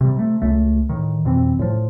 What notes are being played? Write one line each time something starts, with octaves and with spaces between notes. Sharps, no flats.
C3 G3
C3 A3
C#2 A3
A2 D#3
F2 B2 E3 C4
A2 F3